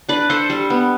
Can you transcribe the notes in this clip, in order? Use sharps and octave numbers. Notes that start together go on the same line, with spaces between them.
D4 B4 D5
D4 A4 C5
G3
B3